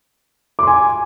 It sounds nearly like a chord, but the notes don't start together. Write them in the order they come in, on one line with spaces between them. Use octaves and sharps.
D6 C6 G#5